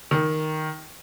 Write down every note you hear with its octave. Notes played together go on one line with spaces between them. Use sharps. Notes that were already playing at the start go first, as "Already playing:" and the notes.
D#3